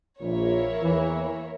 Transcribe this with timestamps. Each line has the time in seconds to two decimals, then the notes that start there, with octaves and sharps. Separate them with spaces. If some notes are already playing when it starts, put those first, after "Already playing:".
0.21 A#1 A#2 A#3 E4 A#4 C#5
0.83 E2 E3